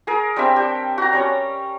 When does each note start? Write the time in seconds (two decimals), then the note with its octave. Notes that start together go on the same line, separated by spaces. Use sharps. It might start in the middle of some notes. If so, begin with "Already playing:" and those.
0.07 G#4 A#4
0.36 G3 C4 D4 E5
0.56 G4
0.98 F#4 A#5
1.13 G3 C#4 C#5